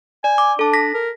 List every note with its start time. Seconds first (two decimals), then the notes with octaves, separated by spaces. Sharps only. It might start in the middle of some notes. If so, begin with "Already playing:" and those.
0.24 D5 G#5
0.38 D6
0.59 D4 A4 A5
0.73 A#6 B6
0.94 A#4